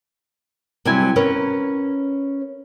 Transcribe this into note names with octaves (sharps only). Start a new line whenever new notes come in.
C3 F#3 G3 E4 G#5
C#4 A#4 B4 C#5